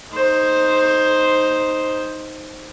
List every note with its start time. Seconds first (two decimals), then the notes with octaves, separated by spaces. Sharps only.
0.13 D#4 C5